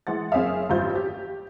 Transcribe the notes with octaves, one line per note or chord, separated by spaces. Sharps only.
E3 G#3 F#5 A6
F#1 C4 G#4 C#5 E5 F5
A1 G2 F4 C5 G6 A6
G4